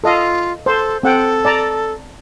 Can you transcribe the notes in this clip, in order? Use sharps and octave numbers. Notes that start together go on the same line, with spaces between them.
F4 A4 D#5 F5
A4 C5
C4 A4 F#5 G5
D5 A5 A#5